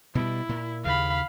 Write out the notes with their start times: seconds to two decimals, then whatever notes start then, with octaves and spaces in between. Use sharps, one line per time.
0.15 B2 G3 E4
0.49 A#2
0.85 D#2 C#3 F5 B5